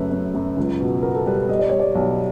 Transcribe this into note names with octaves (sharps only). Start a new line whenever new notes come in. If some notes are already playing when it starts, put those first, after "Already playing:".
Already playing: F#2 C#3 A3 B4
F#2
F#2
C#2
B2
B3 A#4
A4
G3 B4
G3 D#5
D5
G3 C#5
D5
B1